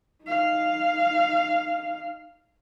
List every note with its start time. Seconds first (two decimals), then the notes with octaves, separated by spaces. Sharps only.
0.24 D#4 F5